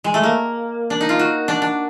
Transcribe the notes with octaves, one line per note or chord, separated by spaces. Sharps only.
G#3
A3
A#3
D4
D#4
F4
F#4
D4
D4